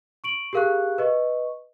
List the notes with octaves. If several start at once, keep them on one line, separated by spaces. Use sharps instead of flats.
C#6 D7 F#7
G4 G#4 A#4 F5 C#6 F#6
B4 D#5 C#6